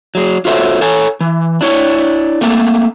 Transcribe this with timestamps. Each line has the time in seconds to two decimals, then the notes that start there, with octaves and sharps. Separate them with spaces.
0.15 F#3 G#4
0.45 F4 F#4 A4 C5 C#5 E5
0.81 A4 C#5 G#5
1.20 E3
1.61 D4 E4 C#5
2.41 A3 A#3 C4 A4